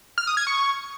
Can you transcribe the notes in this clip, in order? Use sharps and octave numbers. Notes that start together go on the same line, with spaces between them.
F6
D#6
G#6
C#6